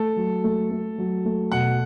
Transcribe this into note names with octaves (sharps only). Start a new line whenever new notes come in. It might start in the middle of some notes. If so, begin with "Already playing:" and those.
Already playing: A3 A4
F#3
A3
A3
F#3
A3
B2 F#5